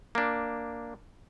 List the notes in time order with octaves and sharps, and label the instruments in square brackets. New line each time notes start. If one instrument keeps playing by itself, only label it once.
[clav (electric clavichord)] A#3 D4